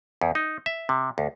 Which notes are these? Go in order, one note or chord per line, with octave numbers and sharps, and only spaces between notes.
E2
D#4
E5
C3
D2